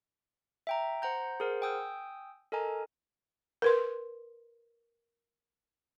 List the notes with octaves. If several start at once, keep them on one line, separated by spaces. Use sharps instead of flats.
E5 G5 A#5
C5 F#5 A#5 G6
G#4 A#4 C5 F#5
G5 G#5 D#6 E6 G6
A4 A#4 D#5 G#5 A#5
A#4 B4 C6